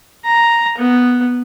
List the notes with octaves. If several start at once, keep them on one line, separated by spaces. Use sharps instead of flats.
A#5
B3